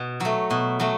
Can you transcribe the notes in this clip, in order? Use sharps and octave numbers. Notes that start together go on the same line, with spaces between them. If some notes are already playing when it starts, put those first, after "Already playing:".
Already playing: B2
F#3 A3
B2
F#3 A3